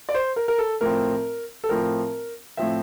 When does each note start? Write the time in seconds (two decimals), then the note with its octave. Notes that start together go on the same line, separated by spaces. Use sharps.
0.09 D5
0.14 C5
0.36 A#4
0.48 A#4
0.58 A4
0.81 A2 F3 C4 A#4
1.64 A4
1.69 A2 F3 C4 A#4
2.57 A2 F3 C4 E5